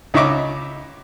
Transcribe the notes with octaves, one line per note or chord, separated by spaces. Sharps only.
C#2 D#4 D#5 E5 C#6 D6